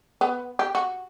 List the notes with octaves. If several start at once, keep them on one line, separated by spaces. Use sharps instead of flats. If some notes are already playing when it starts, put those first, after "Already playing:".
B3
G4
F#4